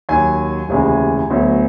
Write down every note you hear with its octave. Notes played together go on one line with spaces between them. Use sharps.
D#2 D#3 F#3 G#5
F1 D#2 C#3 E3 G#3
D2 D3 F#3 B3